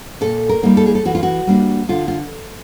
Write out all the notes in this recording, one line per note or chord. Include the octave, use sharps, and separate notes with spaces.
A#2 A4
A#4
G3 A#3 D#4
A4
G#4
A4
E3 F#4
F4
F#4
G3 A#3 D4
D3 F4
F4